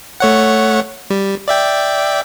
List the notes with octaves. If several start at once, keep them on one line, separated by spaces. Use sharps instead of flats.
A3 C#5 F#5
G3
D5 E5 G5